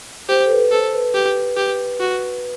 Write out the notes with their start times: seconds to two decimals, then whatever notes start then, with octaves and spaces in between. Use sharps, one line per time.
0.29 G4 C5
0.46 A4
0.51 B4
0.71 A4 C5
0.93 B4
1.14 G4
1.57 G4
2.00 F#4